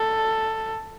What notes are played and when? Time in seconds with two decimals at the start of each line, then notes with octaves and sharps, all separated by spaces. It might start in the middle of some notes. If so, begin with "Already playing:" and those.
Already playing: A4